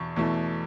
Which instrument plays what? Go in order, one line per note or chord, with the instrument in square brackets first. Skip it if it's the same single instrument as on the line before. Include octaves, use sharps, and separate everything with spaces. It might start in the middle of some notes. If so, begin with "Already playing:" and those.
Already playing: [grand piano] E2 B2 C#6
E2 B2 A3 E4